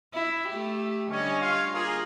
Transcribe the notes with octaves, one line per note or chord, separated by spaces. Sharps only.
E4
A3 G4
D3 G3 C#4 D#5
F4 C#5 F5
A#3 F4 G#4